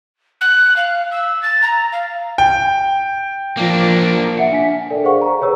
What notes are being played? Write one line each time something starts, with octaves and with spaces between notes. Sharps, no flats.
F#6
F5
E6
A6
A#5
F5
G5
F3 A#3 D4
E5 F#5 C#7
D4 G#5 B6
A4 A#4 D5 G5
G#4 C5 F5 F#5 C#6
A#5
G#4 B4 C#5 A#5 E6